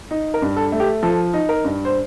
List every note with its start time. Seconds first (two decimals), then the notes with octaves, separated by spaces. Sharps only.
0.11 D#4
0.34 A#4
0.42 G2
0.56 A4
0.72 A3
0.80 G4
1.03 F3 A4
1.34 D#4
1.49 A#4
1.64 G2
1.85 C5